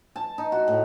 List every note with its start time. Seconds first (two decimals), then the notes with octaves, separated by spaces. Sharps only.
0.16 A5
0.38 D#4
0.52 F#4
0.68 A2